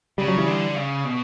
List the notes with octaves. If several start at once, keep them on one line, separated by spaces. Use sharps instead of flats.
C#3 G3
F#3
E3 G3
D3
C#3
B2